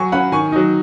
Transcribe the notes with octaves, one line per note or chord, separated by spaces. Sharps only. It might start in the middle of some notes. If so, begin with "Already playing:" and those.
Already playing: F#3 G#5 C#6
C#4 F#5 B5
D#3 G#5 C#6
F#3 D#4